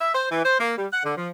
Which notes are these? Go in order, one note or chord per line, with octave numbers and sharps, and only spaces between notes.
E5
C5
E3
C5
A#3
G3
F#5
D3
F3